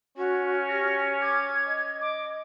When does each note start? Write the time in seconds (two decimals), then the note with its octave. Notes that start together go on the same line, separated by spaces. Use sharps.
0.17 C#4 F#4
0.69 G4 A#6
1.21 D6 G#6
1.66 D#5
2.01 D6